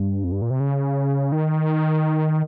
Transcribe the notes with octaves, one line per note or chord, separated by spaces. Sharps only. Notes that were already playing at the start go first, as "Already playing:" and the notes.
Already playing: G2
F2
G2
A#2
C3
C#3
D#3